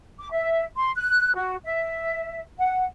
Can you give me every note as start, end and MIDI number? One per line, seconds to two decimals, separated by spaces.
0.19 0.28 86
0.31 0.64 76
0.76 0.90 84
0.97 1.34 90
1.35 1.56 66
1.64 2.38 76
2.58 2.83 78